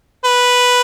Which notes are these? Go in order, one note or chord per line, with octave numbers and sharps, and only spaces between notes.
B4